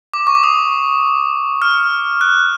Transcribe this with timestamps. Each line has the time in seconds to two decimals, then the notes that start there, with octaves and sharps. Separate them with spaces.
0.14 D6
0.27 C#6
0.35 D6
0.43 D#6
1.62 F6
2.21 F#6